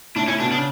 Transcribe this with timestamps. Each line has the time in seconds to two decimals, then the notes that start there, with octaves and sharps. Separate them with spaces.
0.15 A2 D4
0.28 A2 C#4
0.40 B2 D4
0.52 C#3 D4